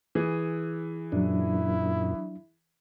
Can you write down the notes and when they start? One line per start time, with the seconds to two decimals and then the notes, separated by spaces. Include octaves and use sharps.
0.15 E3 G#4
1.12 F#2 A#2 F#3 D4 E4